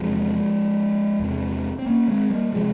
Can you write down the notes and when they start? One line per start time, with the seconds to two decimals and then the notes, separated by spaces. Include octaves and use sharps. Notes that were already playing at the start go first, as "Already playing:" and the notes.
Already playing: E2 C3 F3 G#3
1.19 E2 C3
1.79 C4
1.86 A#3 C#4
2.08 G#3 C4
2.30 G3 A#3
2.52 C3 F3 G#3